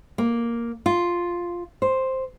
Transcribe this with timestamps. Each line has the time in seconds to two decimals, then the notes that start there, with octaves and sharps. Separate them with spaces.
0.18 A#3
0.86 F4
1.82 C5